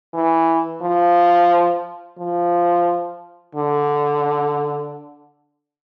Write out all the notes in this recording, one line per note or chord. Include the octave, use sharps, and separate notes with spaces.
E3
F3
F3
D3